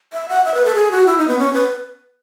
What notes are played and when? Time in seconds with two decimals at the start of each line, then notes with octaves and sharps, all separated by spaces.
0.13 E5
0.29 F#5
0.45 E5
0.54 B4
0.65 A4
0.75 G#4
0.91 F#4
1.06 E4
1.18 D#4
1.28 B3
1.39 C#4
1.54 B4